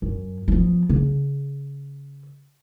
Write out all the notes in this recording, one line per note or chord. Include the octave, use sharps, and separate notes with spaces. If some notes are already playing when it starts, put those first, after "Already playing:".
F#2
F3 B3
C#3